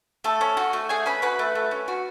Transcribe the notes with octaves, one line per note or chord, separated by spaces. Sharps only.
A3 A4
C#4
F#4
A3
A3 G#4 G#5
C#4 B4 B5
F#4 B4 B5
A3
A3
C#4
F#4